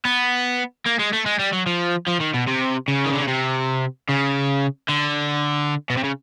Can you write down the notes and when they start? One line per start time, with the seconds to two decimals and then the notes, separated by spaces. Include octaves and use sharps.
0.05 B3
0.86 A#3
0.99 G#3
1.13 A3
1.26 G#3
1.39 G3
1.53 F#3
1.67 F3
2.07 F3
2.20 D#3
2.34 B2
2.47 C3
2.88 C#3
3.06 D#3
3.13 D3
3.21 C#3
3.28 C3
4.09 C#3
4.89 D3
5.90 B2
5.97 C3
6.04 C#3